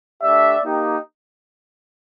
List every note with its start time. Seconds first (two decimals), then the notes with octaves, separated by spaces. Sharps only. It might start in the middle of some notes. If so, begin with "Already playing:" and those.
0.23 A3 D4 G4 D5 E5
0.64 A#3 D#4 G4